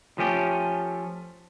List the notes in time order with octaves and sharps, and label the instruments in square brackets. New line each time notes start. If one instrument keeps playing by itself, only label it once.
[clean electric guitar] F3 A3 C#4 G4